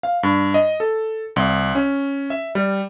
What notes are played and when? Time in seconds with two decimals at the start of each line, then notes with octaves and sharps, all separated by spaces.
0.03 F5
0.23 G2
0.54 D#5
0.80 A4
1.36 C2
1.75 C#4
2.30 E5
2.55 G3